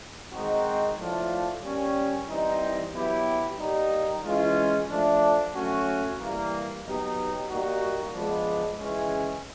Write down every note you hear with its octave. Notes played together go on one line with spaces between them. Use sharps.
D#3 G#3 C4 D#4 F#4
A2 F3 A3 D4 F4
G3 A#3 C#4
E3 G3 C4 D#4
F#3 B3 E4 G4
G3 A#3 D#4
E3 G#3 C#4 F4
F3 A3 D4
F#3 A3 C#4 F#4
E3 G3 A#3
F#3 B3 D#4 G4
G3 A#3 D#4 F#4
F3 G#3 B3 D4
C#3 E3 G#3 C#4